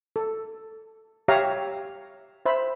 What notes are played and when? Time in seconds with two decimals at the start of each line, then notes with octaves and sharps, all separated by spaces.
0.16 A4
1.28 G4 C#5 E5 F5 A#5
2.46 C5 E5 B5